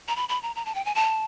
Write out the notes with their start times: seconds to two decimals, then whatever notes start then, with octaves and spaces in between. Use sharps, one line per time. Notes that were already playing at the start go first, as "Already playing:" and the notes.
0.08 A#5
0.16 B5
0.29 B5
0.42 A#5
0.56 A#5
0.66 A5
0.75 G5
0.85 G#5
0.95 A5